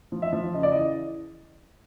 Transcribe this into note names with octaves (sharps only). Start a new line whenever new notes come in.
F3
E5
F3
C#3 D#5
D5
E3 D#5